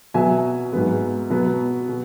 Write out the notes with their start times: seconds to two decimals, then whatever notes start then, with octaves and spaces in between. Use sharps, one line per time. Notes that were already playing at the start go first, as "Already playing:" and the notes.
0.14 B2 F#3 B3 E5 G#5
0.73 G#2 F#3 B3
1.30 B2 F#3 B3
1.88 B2